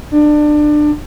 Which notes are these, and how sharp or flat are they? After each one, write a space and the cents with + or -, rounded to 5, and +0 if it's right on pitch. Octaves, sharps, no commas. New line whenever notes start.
D4 +25